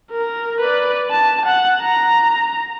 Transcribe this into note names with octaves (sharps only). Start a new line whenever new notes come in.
A#4
B4 D5
A5
F#5
A#5